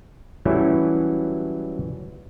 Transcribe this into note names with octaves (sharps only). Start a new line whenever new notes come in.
E3 F#3 G3 A3 C#4 E4